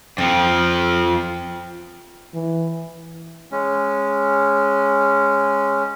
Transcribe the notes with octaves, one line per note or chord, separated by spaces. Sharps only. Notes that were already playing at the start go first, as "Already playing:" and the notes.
F2 F3 C4
E3
G#3 C#4